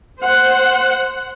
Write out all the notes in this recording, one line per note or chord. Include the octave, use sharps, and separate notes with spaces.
C5 F#5